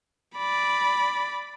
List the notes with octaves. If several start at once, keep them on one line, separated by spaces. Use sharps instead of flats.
D5 B5